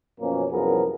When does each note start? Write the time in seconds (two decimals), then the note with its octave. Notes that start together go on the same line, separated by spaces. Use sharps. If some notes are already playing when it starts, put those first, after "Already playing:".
0.21 F#2 B2 F3 A#3 C#4
0.51 C2 F#2 F3 B3 G#4 A#4